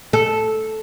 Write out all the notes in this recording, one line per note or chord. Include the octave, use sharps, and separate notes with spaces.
A4